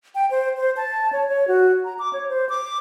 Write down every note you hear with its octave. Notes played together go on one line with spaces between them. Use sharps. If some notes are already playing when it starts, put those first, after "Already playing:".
G5
C5
C5
A5
C#5
C#5
F#4
A#5
D6
C#5
C5
D6